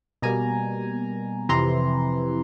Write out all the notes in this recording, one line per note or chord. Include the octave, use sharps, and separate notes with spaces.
B2 G3 A#3 G#5 A#5
F2 C3 E3 A#5 C6